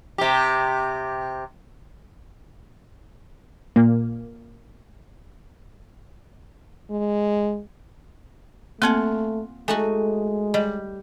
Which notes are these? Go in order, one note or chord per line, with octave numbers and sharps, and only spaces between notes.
C3 G4
A#2 A#3
G#3
A3 A#3 C4 F4 F#5 G#5
G#3 A3 D#4 F#4 G#5
G3 D#5